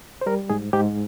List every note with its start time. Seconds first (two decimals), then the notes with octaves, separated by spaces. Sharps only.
0.21 C5
0.26 G3 A#4
0.50 G#2 G#4
0.73 G#2 G4